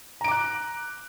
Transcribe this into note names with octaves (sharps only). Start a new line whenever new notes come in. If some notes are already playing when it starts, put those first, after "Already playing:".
A#5 D6 F#6 D7